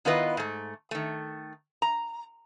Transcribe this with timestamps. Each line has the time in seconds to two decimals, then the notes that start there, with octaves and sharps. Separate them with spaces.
0.05 D#3 B3 E4 F4 B4 D#5
0.37 G#2 A3
0.91 D#3 A3
1.82 A#5